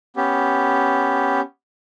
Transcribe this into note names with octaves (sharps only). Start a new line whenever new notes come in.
B3 C#4 G4